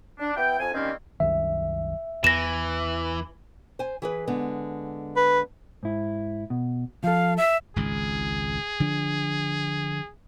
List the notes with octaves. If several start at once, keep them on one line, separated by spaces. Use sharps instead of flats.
D4
B3 E4 G5
F2 G#5
D#3 G3 A#3 C4 C#4
C2 F#2 D#3 E5
E2 E3 A#6 E7
C5 G#5
E3 G#4 B4
D3 G#3 B3
B4
G#2 E4
B2
F3 A4 F5
E5
G#1 C#2 G#2 G#4
D3 F3 D4